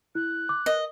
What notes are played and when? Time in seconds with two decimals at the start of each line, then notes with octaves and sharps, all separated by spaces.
0.15 E4 F#6
0.49 D6
0.66 A#4 D#5